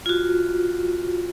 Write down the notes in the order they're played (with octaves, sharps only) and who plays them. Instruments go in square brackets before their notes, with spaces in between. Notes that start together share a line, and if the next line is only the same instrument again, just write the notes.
[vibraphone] F4 F#4